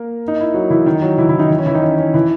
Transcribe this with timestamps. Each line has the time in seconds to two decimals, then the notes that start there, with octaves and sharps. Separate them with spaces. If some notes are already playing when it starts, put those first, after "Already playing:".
Already playing: A#3 A#4
0.28 D#4
0.41 E4
0.54 F#3 F#4
0.70 E3 E4
0.86 D#3 D#4
1.02 F#3 F#4
1.18 E3 E4
1.29 E3 E4
1.39 D#3 D#4
1.50 E3 E4
1.59 C#4
1.66 E3 E4
1.74 D#3 D#4
1.82 C#4
1.98 C#4
2.14 E3 E4